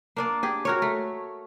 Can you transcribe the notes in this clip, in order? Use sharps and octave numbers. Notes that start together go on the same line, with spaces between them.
A#3 D4 D5
G4 G#4
F#4 A#4 C#5
A3